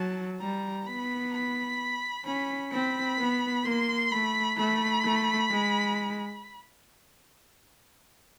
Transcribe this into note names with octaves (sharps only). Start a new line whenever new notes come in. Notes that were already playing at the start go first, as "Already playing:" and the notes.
Already playing: F#3 A5
G3 A#5
B3 B5
B5
C#4 B5
C4 B5
B3
A#3 C6
A3 B5
A3 B5
A3
G#3